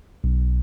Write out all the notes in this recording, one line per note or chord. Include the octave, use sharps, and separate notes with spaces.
B1